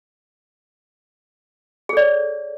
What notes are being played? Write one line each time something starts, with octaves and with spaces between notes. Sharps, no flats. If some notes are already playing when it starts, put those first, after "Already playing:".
G#4 A4 C#5 D5